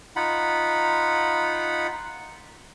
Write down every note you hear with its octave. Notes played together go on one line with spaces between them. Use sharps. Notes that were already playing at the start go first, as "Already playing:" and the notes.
D#4 F4 F#5 B5